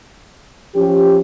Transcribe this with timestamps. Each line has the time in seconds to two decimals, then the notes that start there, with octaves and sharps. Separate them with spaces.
0.75 F3 C#4 G4